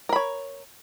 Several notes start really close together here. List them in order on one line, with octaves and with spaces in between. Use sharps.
A#4 B5 C#5